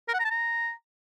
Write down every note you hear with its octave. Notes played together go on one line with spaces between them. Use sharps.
A#4
F#5
A#5
A5
A#5